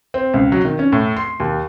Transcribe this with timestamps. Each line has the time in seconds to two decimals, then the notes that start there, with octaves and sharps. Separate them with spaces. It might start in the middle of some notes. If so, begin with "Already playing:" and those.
0.14 C4
0.34 C#2
0.52 F#3
0.65 D#3
0.79 C#4
0.92 A2
1.16 C6
1.40 D#2